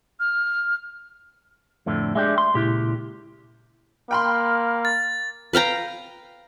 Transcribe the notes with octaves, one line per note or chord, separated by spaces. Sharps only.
F6
F2 A2 D3
G#3 D4 G4 E5
C6
C#2 A#2 E4 G4
A#3 G5 B5 C6 F6
A6
B4 F5 G5 A#5